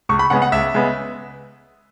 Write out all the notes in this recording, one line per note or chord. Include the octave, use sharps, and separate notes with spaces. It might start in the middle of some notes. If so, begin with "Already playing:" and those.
C#2 C#6
B5
C#3 G#3 B3 F#5
F#5
C#2 E5
C#3 G#3 B3